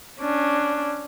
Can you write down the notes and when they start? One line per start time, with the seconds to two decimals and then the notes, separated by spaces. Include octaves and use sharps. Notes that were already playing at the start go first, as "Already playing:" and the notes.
0.20 C#4 D4